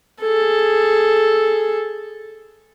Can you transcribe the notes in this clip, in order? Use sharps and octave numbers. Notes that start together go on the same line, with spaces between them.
G#4 A4